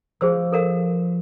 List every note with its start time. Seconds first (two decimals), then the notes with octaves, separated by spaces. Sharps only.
0.21 F3 G#4 C5 E6
0.52 A4 A#4 F5